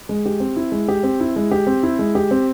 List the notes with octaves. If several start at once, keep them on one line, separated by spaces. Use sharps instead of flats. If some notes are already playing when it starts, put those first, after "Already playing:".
G#3
G4
C4
E4
G#3
G4
C4
E4
G#3
G4
C4
E4
G#3
G4
C4